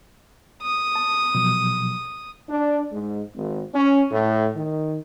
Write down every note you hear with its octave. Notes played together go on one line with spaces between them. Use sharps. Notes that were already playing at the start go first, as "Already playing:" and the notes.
D#6
A5
B2 F3 F#3
D4
G#2
G#1
C#4
A2
D#3